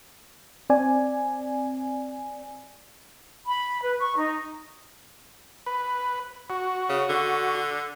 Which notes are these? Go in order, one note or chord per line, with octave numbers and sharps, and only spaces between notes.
C4 D5 G#5
B5
B4
C#6
D#4
B4
F#4
C#3
D3